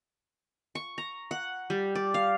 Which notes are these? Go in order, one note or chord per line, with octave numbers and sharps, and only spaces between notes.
C#6
A#5
F#5
G3
D5
F5